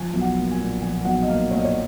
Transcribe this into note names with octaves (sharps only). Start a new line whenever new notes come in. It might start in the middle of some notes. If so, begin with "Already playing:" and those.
Already playing: F3 G#5
B1
F#5
A#3
G#5
A#2
F3 G#5
B1 F#5
D#5
A#3 F5
A#2 C#5
D#5
C#5